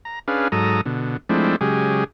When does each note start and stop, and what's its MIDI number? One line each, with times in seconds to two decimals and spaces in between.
0.05 0.19 82
0.28 0.48 61
0.28 0.48 62
0.28 0.48 68
0.28 0.48 71
0.28 0.48 77
0.52 0.81 44
0.52 0.81 54
0.52 0.81 69
0.52 0.81 82
0.52 0.81 87
0.85 1.17 47
0.85 1.17 50
1.29 1.56 53
1.29 1.56 56
1.29 1.56 57
1.29 1.56 60
1.29 1.56 62
1.29 1.56 64
1.61 2.04 49
1.61 2.04 54
1.61 2.04 56
1.61 2.04 67
1.61 2.04 68